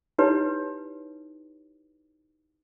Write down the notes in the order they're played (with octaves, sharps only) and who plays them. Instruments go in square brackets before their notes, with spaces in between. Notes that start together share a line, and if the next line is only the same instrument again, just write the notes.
[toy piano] D#4 E4 G4 B4 C#5